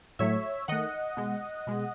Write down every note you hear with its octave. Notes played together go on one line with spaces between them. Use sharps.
A2 F#3 A3 C#5 E5
D#3 A3 D#5 F#5
B2 G#3
B2 G#3